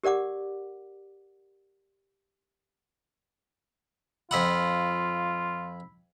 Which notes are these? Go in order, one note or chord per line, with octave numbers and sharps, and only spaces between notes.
G4 A#4 D5 F#5 D6
F2 F4 D#5 F#5 B5 E6 B6